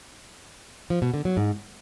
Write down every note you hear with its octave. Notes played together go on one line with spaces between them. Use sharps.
F3
B2
D3
F#3
G#2